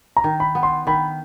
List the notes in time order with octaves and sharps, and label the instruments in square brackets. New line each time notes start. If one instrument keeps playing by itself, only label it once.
[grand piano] A#5
[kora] D#3
[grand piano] B5
[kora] B3
[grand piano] C6
[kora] D#3 [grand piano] B5